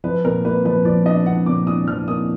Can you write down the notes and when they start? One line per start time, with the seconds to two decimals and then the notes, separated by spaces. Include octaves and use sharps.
0.04 F3 B4
0.24 A#2 A#4
0.44 A#3 B4
0.65 F3 B4
0.85 F3 D5
1.06 D4 D#5
1.26 D4 F#5
1.46 A#2 D6
1.67 D4 D#6
1.88 F3 F6
2.08 A#3 D#6